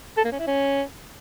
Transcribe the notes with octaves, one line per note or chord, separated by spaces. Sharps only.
A4
A#3
C#4
E4
C#4